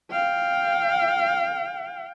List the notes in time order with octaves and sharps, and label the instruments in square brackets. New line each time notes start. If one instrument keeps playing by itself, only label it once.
[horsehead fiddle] F5 G5